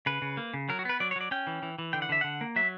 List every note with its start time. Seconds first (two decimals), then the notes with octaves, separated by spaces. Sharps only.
0.06 C#3 B4
0.22 C#3
0.37 A#3
0.54 C#3
0.69 F#3 A#4
0.79 F#4
0.85 B3 B4
1.00 F#3 D5
1.11 C#5
1.16 F#3 D5
1.31 C#4 G5
1.47 E3
1.63 E3
1.79 E3
1.93 D3 G5
2.02 F#5
2.09 D3 E5
2.21 D3 F#5
2.41 A#3
2.56 F#3 E5